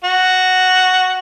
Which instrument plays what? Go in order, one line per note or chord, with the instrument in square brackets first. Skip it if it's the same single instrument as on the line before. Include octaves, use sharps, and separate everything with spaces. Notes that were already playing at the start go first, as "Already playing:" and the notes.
[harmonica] F#4